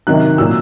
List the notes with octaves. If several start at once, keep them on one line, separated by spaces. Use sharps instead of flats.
C3 D#3 F#3 F#6
A#2 F#3 E6